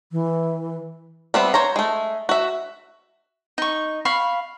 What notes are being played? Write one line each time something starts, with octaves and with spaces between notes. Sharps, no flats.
E3
G3 B3 C4 E5
C5 C#5 A#5
G#3 A3
F#4 E5
D#4 C#6
F5 B5 C#6